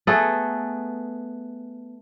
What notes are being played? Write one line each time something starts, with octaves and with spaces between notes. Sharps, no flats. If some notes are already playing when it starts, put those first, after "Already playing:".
A3 B3 G#4 A4